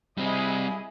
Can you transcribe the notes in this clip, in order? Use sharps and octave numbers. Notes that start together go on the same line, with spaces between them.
G3 C4 E4 G#4 D#5